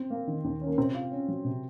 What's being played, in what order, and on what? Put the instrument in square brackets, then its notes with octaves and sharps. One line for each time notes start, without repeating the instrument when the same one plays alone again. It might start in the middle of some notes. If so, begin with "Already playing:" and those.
Already playing: [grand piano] C4
[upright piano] A#3
D#3
D#2
C#4
[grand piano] A#3
[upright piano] C3 [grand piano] C4
[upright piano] F4
C#4
F#3
C3